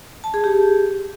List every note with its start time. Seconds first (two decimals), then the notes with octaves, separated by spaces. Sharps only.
0.24 A5
0.34 G#4
0.44 G4